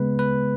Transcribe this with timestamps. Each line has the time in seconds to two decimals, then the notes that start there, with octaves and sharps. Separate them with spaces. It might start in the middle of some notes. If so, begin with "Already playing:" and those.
Already playing: C#3 G#3 B3 B4
0.19 B4